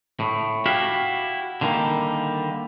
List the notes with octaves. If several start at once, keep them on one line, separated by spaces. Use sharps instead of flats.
A2
E4 F#4 G4 F5 F#5
D3 D#3 G3 G#3 A#3